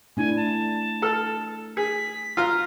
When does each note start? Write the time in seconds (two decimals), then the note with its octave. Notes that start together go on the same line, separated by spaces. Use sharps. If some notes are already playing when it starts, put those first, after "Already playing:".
0.17 A3 D4 E4 G#5
0.36 A5
1.02 A4 F6
1.77 G#4 B6
2.37 F4 F5 A#5 F6